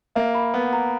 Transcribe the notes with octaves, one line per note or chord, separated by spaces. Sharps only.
A#3 E5
B5
B3 F#5
A#5